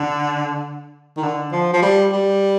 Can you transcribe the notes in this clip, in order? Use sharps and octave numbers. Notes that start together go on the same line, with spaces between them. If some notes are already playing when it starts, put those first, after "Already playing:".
Already playing: D3
D#3
D3
F3
F3
G3
G3